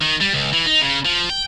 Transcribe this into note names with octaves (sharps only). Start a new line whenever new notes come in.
D#3
G3
C#2
E3
D#4
C#3
F3
G5